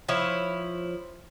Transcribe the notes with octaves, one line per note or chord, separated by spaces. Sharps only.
F3 E4 C#5